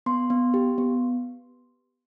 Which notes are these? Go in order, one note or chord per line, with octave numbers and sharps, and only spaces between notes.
B3 C6
B3
G4
B3